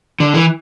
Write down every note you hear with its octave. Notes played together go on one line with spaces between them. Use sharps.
D3
E3